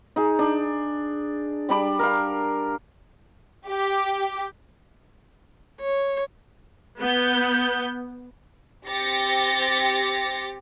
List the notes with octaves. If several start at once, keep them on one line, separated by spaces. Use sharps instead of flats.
D#4 G#4
D4
G3 D4 B5 D6
A#4 F5
G4
C#5
B3 G6
C4 G4 A6 A#6 C#7